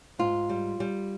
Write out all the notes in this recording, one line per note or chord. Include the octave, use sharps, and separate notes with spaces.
G#2 F4
G3
G3